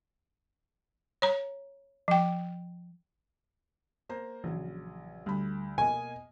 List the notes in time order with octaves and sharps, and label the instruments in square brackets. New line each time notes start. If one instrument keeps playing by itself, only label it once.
[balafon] C#5 A#5
F3 G5
[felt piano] A#3 C5 A#5
[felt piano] A#1 F#3 [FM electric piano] C#3 E3
[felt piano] D2 B5 [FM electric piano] G3
[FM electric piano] B2 D#5 [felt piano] A#3 [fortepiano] G#5